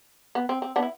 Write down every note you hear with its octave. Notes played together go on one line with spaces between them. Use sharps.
B3
C4
C4
B3 D4
E4